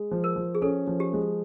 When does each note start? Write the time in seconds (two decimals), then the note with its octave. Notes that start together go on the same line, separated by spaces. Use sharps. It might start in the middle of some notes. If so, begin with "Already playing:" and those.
Already playing: G#3
0.11 F3
0.24 A#4
0.36 F3
0.55 G#4
0.62 C#4 A4
0.87 F3
1.00 G4
1.13 G#3